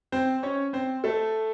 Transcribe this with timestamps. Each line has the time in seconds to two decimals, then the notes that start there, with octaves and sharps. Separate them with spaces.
0.12 C4 C5
0.43 C#4 C#5
0.73 C4 C5
1.04 A3 A4